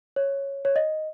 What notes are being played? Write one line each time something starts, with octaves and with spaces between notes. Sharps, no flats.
C#5
C#5
D#5